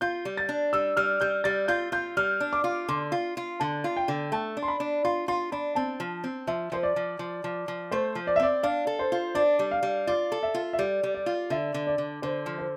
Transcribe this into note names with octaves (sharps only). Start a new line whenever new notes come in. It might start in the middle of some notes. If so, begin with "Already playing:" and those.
F4 G6
G3
A6
D4
G3 E6
G3 F6
G3 G6
G3 A6
F4 G6
F4 G6
G3 F6
D4
D6
F4
D3 C6
F4
F4
D3 A5
F4
G5
D3
A3 A5
D4
C6
B5
D4
F4 C6
F4 C6
D4 B5
C4 A5
F3
C4
F3 E5
F3 C5
D5
F3
F3
F3
F3
A3 C5
F3
D5
E5
C4 D5
D4 F5
A4
C5
F4
D4 D5
G3
F5
G3
F4 D5
A4
E5
F4
E5
G3 D5
G3
D5
F4
D3 E5
D3
D5
D3
D3 C5
F3
C5